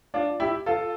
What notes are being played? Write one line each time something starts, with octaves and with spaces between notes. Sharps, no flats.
D4 F4
E4 G4
F4 A4